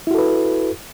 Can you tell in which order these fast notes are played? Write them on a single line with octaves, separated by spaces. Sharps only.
E4 F#4 A4 B4